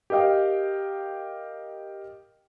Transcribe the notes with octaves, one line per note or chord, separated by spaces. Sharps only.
G4 A#4 D#5 F5 G5